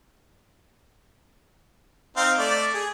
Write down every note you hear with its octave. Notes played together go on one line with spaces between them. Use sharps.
C4 D#4 F5
A3 D5
G#4